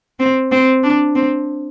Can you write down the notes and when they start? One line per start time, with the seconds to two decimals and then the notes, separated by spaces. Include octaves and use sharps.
0.20 C4
0.51 C4
0.83 D4
1.15 C4